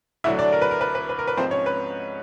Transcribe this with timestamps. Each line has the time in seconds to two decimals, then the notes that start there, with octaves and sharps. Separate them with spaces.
0.24 D2 D3 F#3 E4 E5
0.39 D4 D5
0.52 A#4
0.62 B4
0.71 A#4
0.81 B4
0.95 B4
1.09 B4
1.19 A#4
1.27 B4
1.37 G#2 F3 C4 C5
1.51 C#4 C#5
1.66 B4